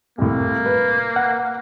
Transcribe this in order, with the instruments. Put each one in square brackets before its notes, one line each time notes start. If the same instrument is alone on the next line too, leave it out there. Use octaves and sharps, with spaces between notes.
[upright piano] C2 A2 [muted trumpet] A#3
[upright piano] B4
[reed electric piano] F#5